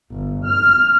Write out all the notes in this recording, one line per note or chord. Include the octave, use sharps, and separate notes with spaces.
G1
F6